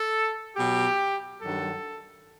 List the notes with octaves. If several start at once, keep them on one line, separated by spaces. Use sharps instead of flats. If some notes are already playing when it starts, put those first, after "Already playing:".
Already playing: A4
B2 F#3 G4
G2 D#3 F#3 A4